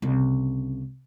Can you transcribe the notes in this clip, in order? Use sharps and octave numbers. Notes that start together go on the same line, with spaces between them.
C2 C#3